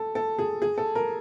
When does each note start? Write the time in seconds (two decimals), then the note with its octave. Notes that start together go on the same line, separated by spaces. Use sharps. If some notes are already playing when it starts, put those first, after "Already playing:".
Already playing: A4
0.15 A4
0.39 G#4
0.62 G#4
0.78 A4
0.95 A#4